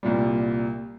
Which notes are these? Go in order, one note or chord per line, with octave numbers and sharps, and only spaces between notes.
C2 A#2 G3